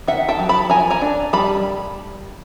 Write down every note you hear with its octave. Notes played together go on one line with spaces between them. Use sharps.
D#3 E5 F#5
G5 A5
F#3
A5 B5
F3 G#5 A#5
G#5 A#5
D4
G3 A5 B5